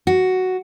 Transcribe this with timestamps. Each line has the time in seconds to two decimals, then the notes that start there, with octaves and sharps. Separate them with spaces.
0.07 F#4